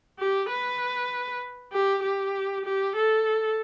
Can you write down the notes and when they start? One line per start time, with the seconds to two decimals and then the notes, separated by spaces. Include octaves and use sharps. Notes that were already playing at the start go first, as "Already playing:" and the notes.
0.19 G4
0.49 B4
1.73 G4
2.03 G4
2.65 G4
2.96 A4